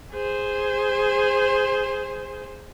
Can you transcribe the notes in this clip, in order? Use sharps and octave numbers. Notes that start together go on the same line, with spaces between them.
G#4 C5